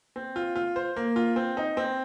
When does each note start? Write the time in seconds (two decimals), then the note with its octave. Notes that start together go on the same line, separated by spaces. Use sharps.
0.16 C4
0.36 F4
0.56 F4
0.76 C5
0.96 A#3
1.16 F4
1.36 C4
1.57 D#4
1.77 C4